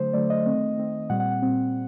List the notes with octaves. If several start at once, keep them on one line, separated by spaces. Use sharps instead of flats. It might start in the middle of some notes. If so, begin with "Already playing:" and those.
Already playing: D3 F#3 A3 C5
D3 F#3 A3 D5
D#5
D#3 A3 C4
D#3 A3 C4
A#2 G3 C4 F#5
F#5
F#5
A#2 G3 C4